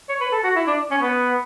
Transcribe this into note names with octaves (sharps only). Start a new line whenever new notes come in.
C#5
B4
A4
F#4
E4
D4
C#4
B3